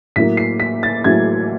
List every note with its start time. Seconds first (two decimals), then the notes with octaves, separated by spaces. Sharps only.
0.16 A2 F#3 A#3 B6
0.37 C7
0.60 B6
0.83 A6
1.04 A2 F#3 A#3 G#6